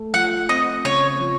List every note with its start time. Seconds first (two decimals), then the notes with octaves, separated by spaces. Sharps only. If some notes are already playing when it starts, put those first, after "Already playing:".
Already playing: A3
0.14 F3 F#5
0.49 C4 D#5
0.85 C#3 C#5
1.20 F3